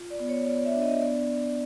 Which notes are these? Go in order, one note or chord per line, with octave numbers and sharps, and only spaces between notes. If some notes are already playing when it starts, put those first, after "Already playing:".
Already playing: F4
D5
B3
C#5
B3 D5
E5
D4
D#5
B3 D5